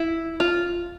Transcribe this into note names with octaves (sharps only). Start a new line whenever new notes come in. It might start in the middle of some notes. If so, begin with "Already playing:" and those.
Already playing: E4
F4